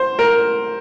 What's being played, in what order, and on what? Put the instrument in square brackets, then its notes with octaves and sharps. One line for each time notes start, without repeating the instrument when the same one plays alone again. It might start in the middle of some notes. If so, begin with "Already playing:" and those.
Already playing: [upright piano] C5
A#4